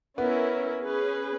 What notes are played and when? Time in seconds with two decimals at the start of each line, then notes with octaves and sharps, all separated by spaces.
0.17 B3 C#4 E4 A#4
0.82 C#4 G#4 B4